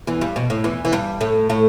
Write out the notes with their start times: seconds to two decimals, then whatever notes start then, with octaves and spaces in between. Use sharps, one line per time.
0.07 E2 E3
0.21 G2 G3
0.36 B2
0.50 A2
0.64 E2 E3
0.85 E3
0.92 G2 G3
1.21 A2 A3
1.50 A2 A3